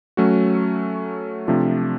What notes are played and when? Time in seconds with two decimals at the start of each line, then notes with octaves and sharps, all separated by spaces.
0.17 F#3 A3 C#4 F#4
1.47 C3 F3 A3 D4 F4